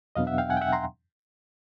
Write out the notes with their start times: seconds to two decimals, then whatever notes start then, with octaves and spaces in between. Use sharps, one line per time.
0.15 E2 B2 F#3 B3 D4 D#5 F5
0.27 E5 F#5
0.38 F5 G5
0.50 F#5 G#5
0.57 G5
0.61 E5 F#5
0.73 A#5 C6